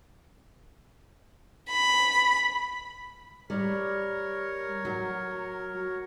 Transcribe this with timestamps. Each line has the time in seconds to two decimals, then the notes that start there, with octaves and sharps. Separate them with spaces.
1.71 B5
3.50 G3 A#4 C#5
4.85 F#3